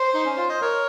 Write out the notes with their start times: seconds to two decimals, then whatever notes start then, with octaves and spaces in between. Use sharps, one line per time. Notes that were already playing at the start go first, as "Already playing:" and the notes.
Already playing: C5
0.14 D#4
0.25 C#4
0.37 F4
0.49 C5 D#5
0.61 A#4 C#5